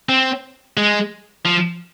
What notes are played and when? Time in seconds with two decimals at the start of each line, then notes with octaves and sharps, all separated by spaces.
0.09 C4
0.77 G#3
1.46 F3